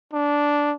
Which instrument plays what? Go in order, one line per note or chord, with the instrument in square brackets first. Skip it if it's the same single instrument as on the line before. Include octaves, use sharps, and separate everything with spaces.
[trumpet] D4